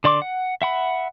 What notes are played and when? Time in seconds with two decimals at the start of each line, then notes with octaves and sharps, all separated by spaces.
0.04 D3 D5 C6 D6
0.22 F#5
0.62 E5 F#5 B5